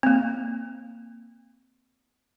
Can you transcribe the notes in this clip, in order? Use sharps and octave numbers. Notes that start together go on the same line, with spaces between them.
A#3 C4